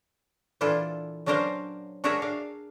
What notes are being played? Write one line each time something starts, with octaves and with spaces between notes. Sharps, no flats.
A#2 E3 D4 E4 F4 A4
F#3 C#4 D4 A#4 C5 F5
D4 F#4 G#4 A#4 C#5 E5
D4 F5